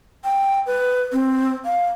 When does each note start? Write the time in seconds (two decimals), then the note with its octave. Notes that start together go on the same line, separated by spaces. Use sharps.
0.24 G5
0.66 B4
1.13 C4
1.65 F5